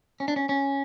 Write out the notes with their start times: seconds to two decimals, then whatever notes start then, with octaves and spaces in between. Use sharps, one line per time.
0.20 C#4
0.28 D4
0.36 C#4
0.49 C#4